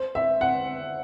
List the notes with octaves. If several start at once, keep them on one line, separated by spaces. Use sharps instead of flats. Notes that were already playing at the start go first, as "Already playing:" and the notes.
Already playing: C5
E5
F#5